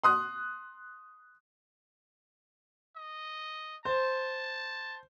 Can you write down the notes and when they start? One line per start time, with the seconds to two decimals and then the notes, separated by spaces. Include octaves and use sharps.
0.03 C6 D#6 F#6
2.97 D#5
3.85 C5 A5